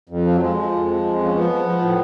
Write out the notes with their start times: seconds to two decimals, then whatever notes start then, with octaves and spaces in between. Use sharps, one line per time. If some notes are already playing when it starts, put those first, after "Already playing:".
0.09 F2
0.25 F3
0.35 F#3
0.41 F3 G#3
0.56 F3
0.72 F2
0.88 F3
1.03 F2
1.18 F3
1.26 C#4
1.34 F3 B3
1.50 F3
1.65 F3
1.81 A2